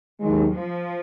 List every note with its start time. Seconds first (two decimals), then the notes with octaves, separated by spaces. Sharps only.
0.20 D#2 D#3 F#3 G#3
0.53 F3